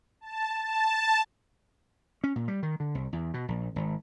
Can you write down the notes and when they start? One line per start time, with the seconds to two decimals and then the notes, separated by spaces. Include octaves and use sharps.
0.21 A5
0.63 A5
2.24 C#4
2.36 A#2
2.48 G3
2.63 D#3
2.80 D3
2.95 C2
3.13 E2
3.34 B2
3.48 A#1
3.76 G#1